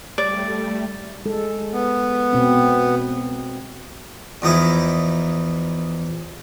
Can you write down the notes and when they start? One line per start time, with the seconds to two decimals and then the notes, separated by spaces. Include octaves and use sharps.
0.18 G3 A3 D5
1.26 G#3 A4
1.73 B3
2.33 B2 C4
4.42 E2 F3 D#4 E4